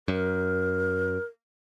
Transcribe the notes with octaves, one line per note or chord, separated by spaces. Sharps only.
F#2 A#4